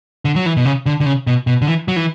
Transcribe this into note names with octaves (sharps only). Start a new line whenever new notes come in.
D3
F#3
E3
B2
C#3
D3
D3
C#3
B2
B2
D3
E3
F#3
E3